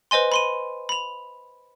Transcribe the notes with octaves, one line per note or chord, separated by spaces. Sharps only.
B4 C5 D#5 G#5 C6
B5 C6 D#7
B5 F7